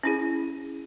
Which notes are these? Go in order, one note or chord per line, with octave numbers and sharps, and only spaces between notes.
C#4 E4 G#4